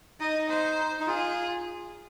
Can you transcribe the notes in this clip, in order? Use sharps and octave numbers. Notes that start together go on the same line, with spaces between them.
D#4 D#5
C5
D#4
F4 G#4